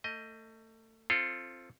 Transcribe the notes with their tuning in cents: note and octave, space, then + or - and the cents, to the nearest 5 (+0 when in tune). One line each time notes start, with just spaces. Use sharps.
A3 +30 D#5 +10
C4 +10 F4 -15 A4 +0